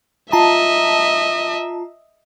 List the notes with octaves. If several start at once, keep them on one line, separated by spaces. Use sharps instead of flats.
F4 D#5 E5 A5 A#5